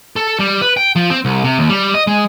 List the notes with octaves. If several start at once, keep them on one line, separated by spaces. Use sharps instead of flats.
A4
G3
B4
G5
F3
C4
C2
C3
D#2
G3
D#5
G#3